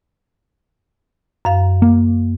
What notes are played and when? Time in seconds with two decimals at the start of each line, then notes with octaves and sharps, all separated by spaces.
1.45 F#2 F5
1.82 A#3